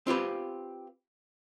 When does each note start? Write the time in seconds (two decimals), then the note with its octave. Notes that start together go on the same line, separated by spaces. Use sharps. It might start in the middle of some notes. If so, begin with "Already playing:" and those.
0.07 C4 F4 G4 B4